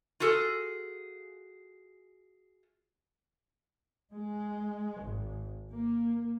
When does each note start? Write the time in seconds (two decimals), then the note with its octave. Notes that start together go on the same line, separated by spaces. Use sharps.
0.20 F4 F#4 G#4 A4
4.13 G#3
5.03 G#1
5.71 A#3